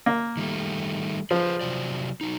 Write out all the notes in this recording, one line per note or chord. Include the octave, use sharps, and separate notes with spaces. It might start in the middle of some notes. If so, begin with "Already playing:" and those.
A#3
D#3 G3 A3
F3 G#4 B4 C5
C3 F#3 D5
F#3 D#4